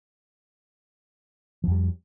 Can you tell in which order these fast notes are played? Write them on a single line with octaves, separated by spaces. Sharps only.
F3 F2 G3